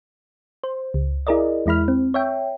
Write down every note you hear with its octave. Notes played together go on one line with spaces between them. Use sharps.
C5
C#2
E4 G#4 A#4 D5 D#5
E2 G#3 E4 B5 F6
C4
C#5 E5 G5